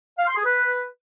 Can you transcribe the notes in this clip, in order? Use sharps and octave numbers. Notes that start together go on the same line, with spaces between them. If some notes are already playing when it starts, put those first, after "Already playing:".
F5
C6
G#4
B4